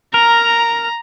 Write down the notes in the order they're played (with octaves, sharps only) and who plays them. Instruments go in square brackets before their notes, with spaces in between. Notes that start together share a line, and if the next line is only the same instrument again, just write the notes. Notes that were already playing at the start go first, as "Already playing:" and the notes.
[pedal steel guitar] A#4 [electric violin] A#5